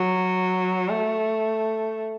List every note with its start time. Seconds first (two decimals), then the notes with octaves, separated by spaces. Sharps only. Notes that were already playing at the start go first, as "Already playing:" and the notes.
Already playing: F#3
0.89 A3